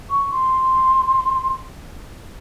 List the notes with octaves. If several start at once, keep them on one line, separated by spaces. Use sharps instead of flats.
C#6
C6